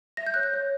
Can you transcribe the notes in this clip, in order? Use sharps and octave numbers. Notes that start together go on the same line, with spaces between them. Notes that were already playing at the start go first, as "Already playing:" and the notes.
E5 A#6
G6
C#5 F#6
G6
C#5